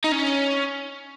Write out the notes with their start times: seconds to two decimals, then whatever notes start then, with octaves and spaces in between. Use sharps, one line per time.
0.04 D#4
0.12 C#4